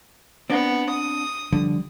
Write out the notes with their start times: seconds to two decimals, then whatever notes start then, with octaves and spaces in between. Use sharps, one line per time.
0.50 B3 C4 D4
0.89 D#6
1.53 D3 F3 G3